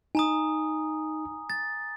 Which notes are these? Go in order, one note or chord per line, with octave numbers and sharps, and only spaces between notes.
D#4 G#5 A#5 D#6
A6